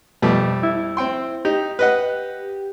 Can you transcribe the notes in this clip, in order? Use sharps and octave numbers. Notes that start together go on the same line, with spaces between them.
F2 B2 G3 A3
E4
C4 G5 C6
D#4 G4
B4 D#5 F#5